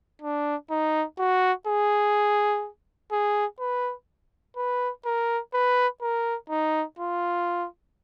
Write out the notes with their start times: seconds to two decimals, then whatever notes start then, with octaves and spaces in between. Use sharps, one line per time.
0.22 D4
0.71 D#4
1.18 F#4
1.67 G#4
3.12 G#4
3.60 B4
4.57 B4
5.05 A#4
5.54 B4
6.02 A#4
6.50 D#4
6.99 F4